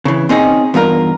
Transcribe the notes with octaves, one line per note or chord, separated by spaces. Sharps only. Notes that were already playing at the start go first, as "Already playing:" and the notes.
C#3 E3
C4 C#4 D#4 G#4
E2 G2 F4 A#4